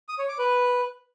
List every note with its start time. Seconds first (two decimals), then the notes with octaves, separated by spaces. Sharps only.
0.09 D#6
0.19 C#5
0.29 D6
0.39 B4